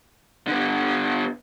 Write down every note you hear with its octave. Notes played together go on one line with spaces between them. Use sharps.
D3 B3